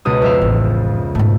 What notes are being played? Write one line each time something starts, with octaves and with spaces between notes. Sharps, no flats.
C#2 B2 D#6
F2 E5 F5
A1
G#2 B2 A3